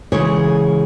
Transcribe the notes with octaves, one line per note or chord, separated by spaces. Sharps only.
C#3 E3 G#3 C#5